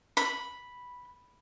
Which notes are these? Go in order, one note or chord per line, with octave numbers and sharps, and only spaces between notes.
B5